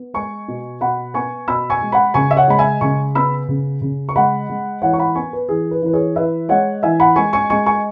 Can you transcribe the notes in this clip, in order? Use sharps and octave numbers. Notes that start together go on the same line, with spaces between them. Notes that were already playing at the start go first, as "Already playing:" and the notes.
Already playing: B3
G#3 G#5 C#6
B2
B2 F#5 B5
B3 G#5 C#6
B2 B5 E6
G#5 C#6
G#3
F#5 B5
C#3 G#5 C#6
E5
C#5 F#5
G#3 B5
E5 G#5
C#3 G#5 C#6
B3 B5 E6
C#3
C#3
C#6
G#3 F#5 B5
G#3
E3 C#5 F#5
C#6
F#5 B5
B3 G#5 C#6
B4
E3 G#4
B4
E3 B4
G#4 C#5
E3 B4 E5
G#3 C#5 F#5
E3 E5 G#5
F#5 B5
G#3 G#5 C#6
G#5 C#6
G#3 G#5 C#6
G#5 C#6